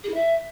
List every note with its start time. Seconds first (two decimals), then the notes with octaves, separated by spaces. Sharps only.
0.03 G#4
0.08 E4
0.13 E5